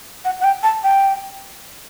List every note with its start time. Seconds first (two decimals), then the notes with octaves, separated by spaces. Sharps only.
0.25 F#5
0.40 F#5
0.44 G5
0.63 A5
0.84 G5